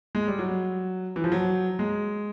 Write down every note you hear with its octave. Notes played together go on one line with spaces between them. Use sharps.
G#3
G3
F#3
E3
F3
F#3
G#3